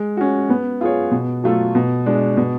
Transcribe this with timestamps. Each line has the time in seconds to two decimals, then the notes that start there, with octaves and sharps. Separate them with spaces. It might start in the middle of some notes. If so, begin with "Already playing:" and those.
Already playing: G#3
0.17 C#4 F#4
0.49 B3
0.81 F4 G#4 C#5
1.11 B2
1.44 F#3 A3 F4 A4
1.75 B2
2.06 G#3 D4
2.37 B2